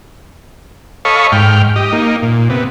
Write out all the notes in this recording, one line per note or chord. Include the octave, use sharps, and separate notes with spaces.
A4 C#5 D#5 F5 B5 C#6
G#2 G5 F6
G4 D#5
A#3 D#4
A#2
C3 B3